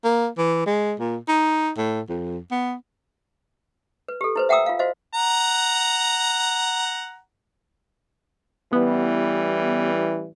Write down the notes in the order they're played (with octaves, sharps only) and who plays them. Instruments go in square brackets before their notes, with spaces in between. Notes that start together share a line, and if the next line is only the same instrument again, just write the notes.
[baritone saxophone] A#3
E3
G#3
A#2
D#4
A2
F2
B3
[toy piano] B4
G4 A4
E4 B4 C5
E5 F#5 G5 A#5 D#6 E6
F4 F5
F#4 C5 D#5 F5
[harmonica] F#5 A#5
[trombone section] A1 E3 G3 [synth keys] B3